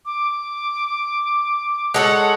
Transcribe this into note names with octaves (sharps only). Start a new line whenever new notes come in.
D6
G#3 A4 C#5 F#5